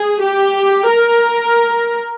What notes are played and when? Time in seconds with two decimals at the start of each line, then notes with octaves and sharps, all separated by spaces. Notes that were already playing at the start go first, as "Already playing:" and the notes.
Already playing: G#4
0.23 G4
0.91 A#4